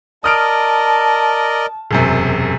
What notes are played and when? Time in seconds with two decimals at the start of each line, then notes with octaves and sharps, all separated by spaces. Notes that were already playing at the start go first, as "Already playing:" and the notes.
0.24 A#4 D5 D#5 A5 D#6 F6 D7
1.91 E1 F#2 C3